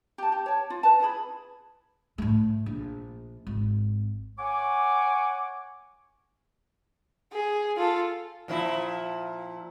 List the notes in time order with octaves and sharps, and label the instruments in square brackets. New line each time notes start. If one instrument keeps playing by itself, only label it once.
[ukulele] G4 A5
G4
C#5 A5
F4
B4 A5
E4 F4 G#4 B5
[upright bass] A2 A3
A#1
G#1
[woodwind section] C#5 F#5 G#5 D6
[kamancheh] G#4
F4 A4
[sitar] A#2 F3 E4